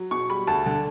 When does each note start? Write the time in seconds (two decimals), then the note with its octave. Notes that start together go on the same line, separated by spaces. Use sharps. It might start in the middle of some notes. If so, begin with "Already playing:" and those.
Already playing: F#3
0.11 B2 C#6
0.30 G3 B5
0.47 D2 A5
0.66 D3